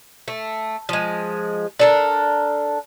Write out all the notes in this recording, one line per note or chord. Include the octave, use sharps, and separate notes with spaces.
A3
F3 G#3
D4 A4 A#4